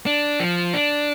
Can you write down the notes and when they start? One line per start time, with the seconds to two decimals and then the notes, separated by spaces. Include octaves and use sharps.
0.06 D4
0.40 F3
0.74 D4